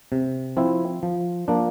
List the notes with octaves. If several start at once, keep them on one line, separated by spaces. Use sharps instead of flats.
C3
F3 C4 E4
F3
F3 A#3 D4